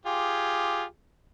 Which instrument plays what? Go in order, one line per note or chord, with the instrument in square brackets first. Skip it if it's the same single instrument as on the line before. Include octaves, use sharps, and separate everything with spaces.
[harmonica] F4 G4 G#4